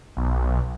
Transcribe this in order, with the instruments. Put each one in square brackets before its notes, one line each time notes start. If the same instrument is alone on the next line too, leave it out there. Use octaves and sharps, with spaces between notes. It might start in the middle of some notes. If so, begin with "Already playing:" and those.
[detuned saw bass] B1